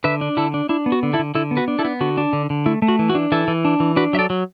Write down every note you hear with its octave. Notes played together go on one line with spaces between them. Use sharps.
D3 B4 E5
D4
D3 E4 A4
D4
D4 E4
B3
F#4
D3
E4 A4
D3
D3 E4 A4
B3
F#4 B4
D4
E4 A4
B3
D3 F#4
D4
D3
D3
A3 E4
A3
F#4
E3
F#4
D4
E3 E4 A4
E3
D4
E3
D4 F#4 B4
F#3 E5
A4 D5
F#3